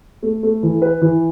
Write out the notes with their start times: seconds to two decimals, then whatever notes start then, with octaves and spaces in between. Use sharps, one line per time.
0.23 A3
0.43 A3
0.63 E3
0.82 B4
1.01 E3